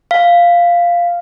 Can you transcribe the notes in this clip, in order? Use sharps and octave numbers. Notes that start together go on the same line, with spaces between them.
F5